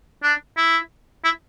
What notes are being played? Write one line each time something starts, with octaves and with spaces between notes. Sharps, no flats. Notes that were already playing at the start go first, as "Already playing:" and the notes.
D4
E4
E4